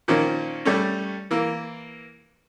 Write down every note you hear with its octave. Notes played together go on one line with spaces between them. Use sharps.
A#2 D#3 F3 A#3 C#4
G3 A3 C#4
E3 A#3